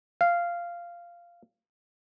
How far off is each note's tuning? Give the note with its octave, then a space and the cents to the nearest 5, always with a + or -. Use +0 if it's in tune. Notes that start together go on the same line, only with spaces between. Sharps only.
F5 -10